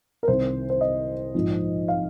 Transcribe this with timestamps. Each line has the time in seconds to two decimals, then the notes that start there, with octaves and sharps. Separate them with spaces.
0.23 A#4
0.28 C2 C3 D#3 C5
0.70 C5
0.81 D#5
1.35 A#1 G#2 F3
1.88 F5